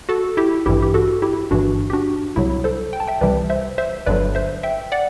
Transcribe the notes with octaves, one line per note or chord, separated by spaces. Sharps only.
F#4 A4
E4 G4
A1 G2 E3 E4 G4
G4
F#4 A4
E4 G4
G1 G2 E3 D4 F#4
G4
D4 F#4
C2 C3 F#3 E4
A4 C5
G5
A5
E5 G5
C2 C3 E3 G3 B4 D5
C5 E5
C5 E5
G1 G2 D3 F#3 B4 D5
C5 E5
E5 G5
D5 F#5